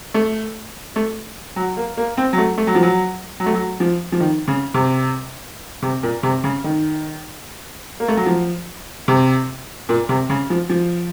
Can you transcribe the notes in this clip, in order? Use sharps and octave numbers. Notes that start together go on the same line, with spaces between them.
A3
A3
F#3
A#3
A#3
C4
F#3
A3
A3
F#3
F3
F#3
F#3
A3
F#3
F3
F3
D#3
C#3
C3
C3
A#2
C3
C#3
D#3
A#3
A3
F#3
F3
C3
A#2
C3
C#3
F3
F3